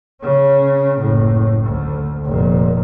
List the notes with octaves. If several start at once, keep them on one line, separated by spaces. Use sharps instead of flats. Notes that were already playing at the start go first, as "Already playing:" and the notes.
C#3 C#4
F#1 A2
D2
F1 A#2